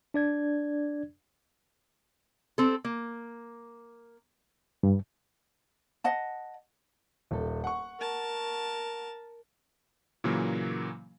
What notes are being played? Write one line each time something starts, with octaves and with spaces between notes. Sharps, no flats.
D4 D5 G#6
C4 A4
A#3
G2
D#5 F#5 A5
D#1 A4
F#5 C#6
A#4 A5
A#2 C#3 E3 F#3 A#3